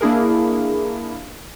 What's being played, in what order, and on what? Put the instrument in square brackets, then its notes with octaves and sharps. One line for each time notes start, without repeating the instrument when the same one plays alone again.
[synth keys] A#3 D4 E4 G#4 A#4